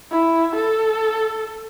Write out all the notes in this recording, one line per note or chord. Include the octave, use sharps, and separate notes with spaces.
E4
A4